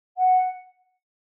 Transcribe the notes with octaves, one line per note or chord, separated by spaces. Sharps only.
F#5